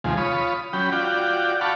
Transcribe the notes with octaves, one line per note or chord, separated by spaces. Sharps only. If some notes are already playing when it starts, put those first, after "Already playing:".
D#2 C3 F3 G#3
F4 C#5 B5 D#6
F#3 C#4 G5 B5
F4 F#4 D5 G5
D5 F5 F#5 A5 B5 C#6